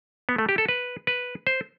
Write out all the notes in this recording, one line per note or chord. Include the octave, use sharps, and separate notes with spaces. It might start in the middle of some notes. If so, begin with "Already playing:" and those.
B3
A3
G4
A4
B4
B4
C5